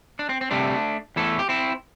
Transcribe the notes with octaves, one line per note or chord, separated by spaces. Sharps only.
D4
C4
C4
C3 G3 A3 D4
E2 E3 A3 E4 A4
G4
C4 E4